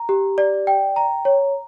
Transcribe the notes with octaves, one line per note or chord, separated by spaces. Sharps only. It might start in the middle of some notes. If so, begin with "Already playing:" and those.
Already playing: A#5
G4
D5
G5
A#5
C#5